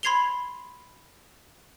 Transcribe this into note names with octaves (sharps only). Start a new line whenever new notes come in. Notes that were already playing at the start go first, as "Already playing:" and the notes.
B5 C6 G#6 C7 F7 G7